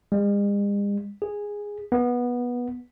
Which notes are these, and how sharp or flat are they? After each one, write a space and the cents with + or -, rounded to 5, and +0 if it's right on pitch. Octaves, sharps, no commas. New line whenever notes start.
G#3 -45
G#4 -10
B3 -15